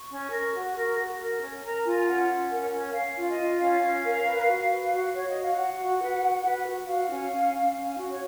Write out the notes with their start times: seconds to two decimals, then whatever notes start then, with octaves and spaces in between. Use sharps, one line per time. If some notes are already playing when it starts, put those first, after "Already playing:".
Already playing: C#6
0.10 C#4
0.31 A#4
0.54 F#4
0.76 A#4
0.98 F#4
1.20 A#4
1.41 C#4
1.63 A#4 A#5
1.85 F4 G#5
1.97 G#5
2.07 C#4 F#5
2.29 C#4
2.51 A#4
2.72 C#4
2.94 C#4 F5
3.17 F4
3.27 D#5
3.38 F4
3.60 C#4 F5
3.82 C#4
4.04 A#4
4.26 B4
4.48 F#4
4.69 B4
4.91 F#4
5.13 F#4 C#5
5.29 D#5
5.35 F#4
5.43 F5
5.57 F#4 F#5
5.79 F#4
6.01 B4
6.23 F#4
6.45 B4
6.66 F#4
6.88 F#4 F5
7.10 C#4
7.32 C#4
7.54 C#4
7.75 C#4
7.98 F#4
8.11 C#5